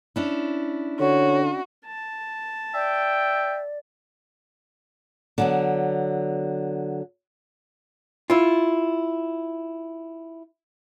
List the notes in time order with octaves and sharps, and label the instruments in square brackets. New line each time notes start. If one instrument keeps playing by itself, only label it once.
[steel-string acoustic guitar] C#4 D4 E4
[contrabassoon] D3 [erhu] F#4 [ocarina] C#5
[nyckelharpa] A5
[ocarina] D5 [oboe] E5 [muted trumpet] G5
[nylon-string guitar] D3 F#3 B3
[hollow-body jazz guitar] E4 F4